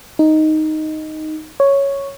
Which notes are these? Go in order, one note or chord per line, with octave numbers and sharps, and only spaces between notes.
D#4
C#5